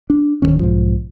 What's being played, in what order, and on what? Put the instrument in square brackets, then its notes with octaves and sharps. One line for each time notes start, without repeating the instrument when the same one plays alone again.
[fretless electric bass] D4
D1 E2 D#3 C#4
B1 G#2 F3